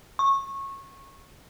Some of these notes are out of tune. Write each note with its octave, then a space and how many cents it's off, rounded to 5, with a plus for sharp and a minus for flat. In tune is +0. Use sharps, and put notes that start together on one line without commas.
C#6 -20